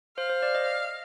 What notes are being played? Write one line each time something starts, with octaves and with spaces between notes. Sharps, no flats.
C5 F5
C5
D5
D#5